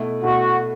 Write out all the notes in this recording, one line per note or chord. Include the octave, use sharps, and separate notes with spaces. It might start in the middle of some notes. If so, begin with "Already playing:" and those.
Already playing: B2 A3 E4
B2 A3 E4 F#4